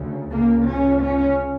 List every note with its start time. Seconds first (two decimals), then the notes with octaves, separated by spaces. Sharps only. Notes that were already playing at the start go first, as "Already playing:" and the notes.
Already playing: D2 C#3
0.30 C#2 C#3 A#3
0.65 C#4
1.00 C#4